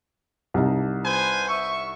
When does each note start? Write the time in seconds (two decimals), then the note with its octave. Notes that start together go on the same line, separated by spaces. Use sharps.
0.54 C2 D#4
1.04 B4 C5 G#5
1.48 E5 C#6